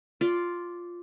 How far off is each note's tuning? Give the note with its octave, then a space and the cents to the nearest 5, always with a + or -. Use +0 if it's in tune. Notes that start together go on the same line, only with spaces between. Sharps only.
F4 +0 D5 -5